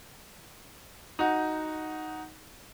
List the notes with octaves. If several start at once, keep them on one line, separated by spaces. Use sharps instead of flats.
D#4 F#4